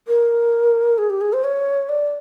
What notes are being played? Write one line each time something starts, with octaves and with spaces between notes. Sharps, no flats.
A#4
G#4
G4
G#4
C5
C#5
D5